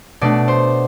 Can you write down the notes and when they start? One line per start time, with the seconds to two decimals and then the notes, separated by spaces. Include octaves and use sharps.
0.21 B2 A3 D4 D5
0.48 C5